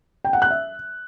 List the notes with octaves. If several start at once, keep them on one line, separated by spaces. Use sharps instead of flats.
G5
F#5
F#6
E5